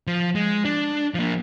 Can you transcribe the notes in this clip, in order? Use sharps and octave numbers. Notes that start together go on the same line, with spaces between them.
F3
G#3
D4
F3 A#3